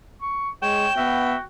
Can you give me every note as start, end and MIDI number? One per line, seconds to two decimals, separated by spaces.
0.22 0.50 85
0.62 0.86 56
0.62 0.91 73
0.62 1.43 79
0.62 0.95 100
0.97 1.35 59
0.97 1.43 66
0.97 1.37 76